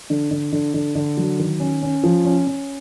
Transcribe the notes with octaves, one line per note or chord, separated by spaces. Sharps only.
D3
D3
D3
D3
D3
F#3
D#3
C#4
C#4
F3
C#4
C#4